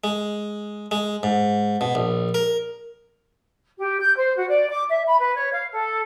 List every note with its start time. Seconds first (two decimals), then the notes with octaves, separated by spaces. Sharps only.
0.04 G#3
0.91 G#3
1.23 G#2
1.81 B2
1.95 A#1
2.34 A#4
3.78 G4
4.00 G6
4.17 C5
4.36 F#4
4.49 D5
4.71 D6
4.90 E5
5.07 B5
5.20 B4
5.37 C#5
5.52 F5
5.72 A4